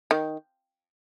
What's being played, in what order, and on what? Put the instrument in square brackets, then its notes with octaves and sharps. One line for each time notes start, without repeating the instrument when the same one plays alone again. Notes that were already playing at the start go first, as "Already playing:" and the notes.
[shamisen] D#3